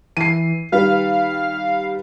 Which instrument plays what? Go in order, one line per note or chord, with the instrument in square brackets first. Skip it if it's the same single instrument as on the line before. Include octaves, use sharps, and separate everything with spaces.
[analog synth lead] E3 [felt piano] C7 D#7
[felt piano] D#3 G3 B4 [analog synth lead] F5